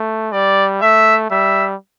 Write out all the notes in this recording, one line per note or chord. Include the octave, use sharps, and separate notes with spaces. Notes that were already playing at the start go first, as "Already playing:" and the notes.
Already playing: A3
G3 D5
A3 E5
G3 E5